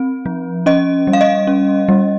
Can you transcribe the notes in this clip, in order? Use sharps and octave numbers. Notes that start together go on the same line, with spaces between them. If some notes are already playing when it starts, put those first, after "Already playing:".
Already playing: C4
F3
C#4 D#5
G3
F5
D#5
C#4
G3